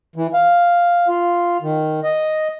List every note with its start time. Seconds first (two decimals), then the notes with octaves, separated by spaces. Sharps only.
0.16 E3
0.34 F5
1.08 F4
1.62 D#3
2.03 D#5